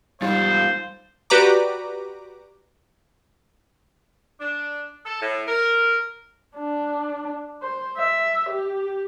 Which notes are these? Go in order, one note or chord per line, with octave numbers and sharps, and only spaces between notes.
G3 G#3 D#4 F4 C5 F5 A6
F#4 G4 B4 D5 A#5 D6
D4
A4
A2
A#4
D4
C5
E5
G4